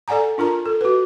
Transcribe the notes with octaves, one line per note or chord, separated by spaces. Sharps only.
A4 D5 F#5 G#5 A#5
D4 F4 A#4 A#5
A4
F#4 B4